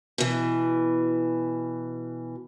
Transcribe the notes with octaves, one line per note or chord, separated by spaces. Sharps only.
B2 E3